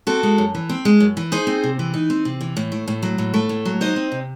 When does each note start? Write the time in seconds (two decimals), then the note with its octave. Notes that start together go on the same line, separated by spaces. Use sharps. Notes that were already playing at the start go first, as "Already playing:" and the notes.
0.07 C4 F#4 A4
0.23 G#3
0.38 F#2
0.55 E3
0.69 C4
0.85 G#3
1.00 F#2
1.17 E3
1.32 D#4 G#4 C5
1.47 C4
1.64 C3
1.79 E3
1.94 D#4
2.10 C4
2.25 C3
2.41 E3
2.57 A2
2.72 A3
2.88 A2
3.03 F#3
3.18 A2
3.34 A3
3.49 A2
3.65 F#3
3.81 D#4 C5 D#5
3.96 C4
4.12 C3